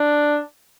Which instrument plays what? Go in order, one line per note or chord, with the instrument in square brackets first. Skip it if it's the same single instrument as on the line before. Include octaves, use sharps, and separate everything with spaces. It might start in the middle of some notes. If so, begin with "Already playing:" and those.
Already playing: [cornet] D4